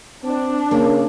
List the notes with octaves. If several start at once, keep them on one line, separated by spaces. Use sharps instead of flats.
C4 D4
C#3 A#3